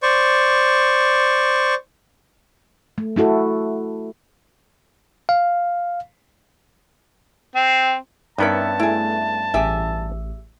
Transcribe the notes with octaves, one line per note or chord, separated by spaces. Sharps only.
C5 D5 C#6
A3
A3 E4 F#4 A4
F5
C4
G2 B3 C#4 D#4 A#4 E5 A5
A3 E4 G#4
A1 G4 G#4 E5